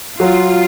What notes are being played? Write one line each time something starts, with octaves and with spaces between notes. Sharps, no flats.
F#3 F4